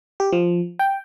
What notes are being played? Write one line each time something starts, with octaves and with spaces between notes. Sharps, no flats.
G4
F3
G5